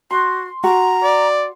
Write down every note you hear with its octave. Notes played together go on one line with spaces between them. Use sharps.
F#4 C6
F#4 A#5
D5